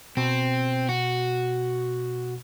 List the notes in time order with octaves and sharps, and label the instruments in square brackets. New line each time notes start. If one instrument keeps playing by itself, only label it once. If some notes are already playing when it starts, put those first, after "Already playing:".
[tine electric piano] B2 [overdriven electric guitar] C4
[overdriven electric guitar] F#4